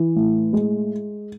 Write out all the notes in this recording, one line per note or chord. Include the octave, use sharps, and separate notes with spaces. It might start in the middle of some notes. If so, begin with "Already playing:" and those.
Already playing: E3
A2
G#3